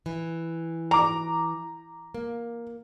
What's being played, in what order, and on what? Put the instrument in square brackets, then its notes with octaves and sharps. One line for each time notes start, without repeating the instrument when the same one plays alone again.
[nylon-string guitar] E3
[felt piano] A#5 D6
[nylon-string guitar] A#3